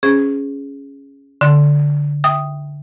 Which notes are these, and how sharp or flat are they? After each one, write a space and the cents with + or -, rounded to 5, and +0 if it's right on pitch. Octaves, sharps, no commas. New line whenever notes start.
C#4 +0 G#4 +0 C5 +0
D3 -10 C6 +0
E5 +0 G5 +0 D#6 +0